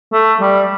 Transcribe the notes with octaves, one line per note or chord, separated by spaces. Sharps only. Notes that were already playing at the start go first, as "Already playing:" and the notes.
A3
G3